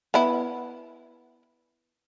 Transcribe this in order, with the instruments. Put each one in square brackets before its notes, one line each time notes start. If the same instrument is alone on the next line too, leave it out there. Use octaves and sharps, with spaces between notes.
[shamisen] B3 E4